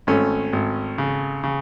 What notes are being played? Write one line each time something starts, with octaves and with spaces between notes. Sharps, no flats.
G#1 A3 C#4
G#1
C#3
C#3